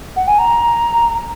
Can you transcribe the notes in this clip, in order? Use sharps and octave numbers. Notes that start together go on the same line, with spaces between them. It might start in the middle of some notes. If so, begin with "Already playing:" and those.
F#5
G#5
A#5